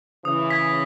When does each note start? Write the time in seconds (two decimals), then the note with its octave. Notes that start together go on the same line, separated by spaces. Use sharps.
0.25 C#3 E3 D#6
0.50 G#6 B6